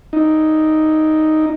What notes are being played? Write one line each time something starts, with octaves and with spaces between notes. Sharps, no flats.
D#4